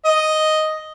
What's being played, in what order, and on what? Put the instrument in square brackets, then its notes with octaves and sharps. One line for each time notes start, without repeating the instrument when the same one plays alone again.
[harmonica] D#5